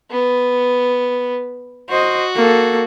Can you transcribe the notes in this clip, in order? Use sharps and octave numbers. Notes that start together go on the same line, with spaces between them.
B3
F#4 C5 D#5
A#3 A4